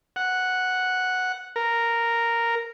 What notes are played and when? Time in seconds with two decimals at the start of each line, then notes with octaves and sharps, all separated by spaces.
0.16 F#5
1.56 A#4